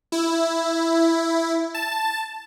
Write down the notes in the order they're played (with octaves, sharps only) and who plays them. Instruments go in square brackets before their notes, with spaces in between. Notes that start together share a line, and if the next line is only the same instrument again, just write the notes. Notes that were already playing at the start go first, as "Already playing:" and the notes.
[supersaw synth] E4
A5